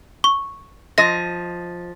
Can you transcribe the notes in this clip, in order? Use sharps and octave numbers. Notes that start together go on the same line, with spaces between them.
C#6
F3 D#5 A#6